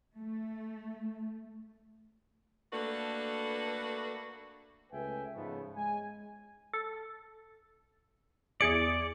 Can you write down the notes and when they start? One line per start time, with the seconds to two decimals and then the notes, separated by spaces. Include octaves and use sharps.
0.16 A3
2.73 A3 A#3 D4 F#4 A4 B4
4.92 C#2 A3 B4 E5 G5 G#5
5.35 G#2 C#3 F3 G#3 A3 B3
5.77 G#3 G#5
6.74 A4
8.61 E2 G#4 D5 C#7